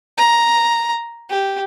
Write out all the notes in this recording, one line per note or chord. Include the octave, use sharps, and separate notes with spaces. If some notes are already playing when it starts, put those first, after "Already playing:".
A#5
G4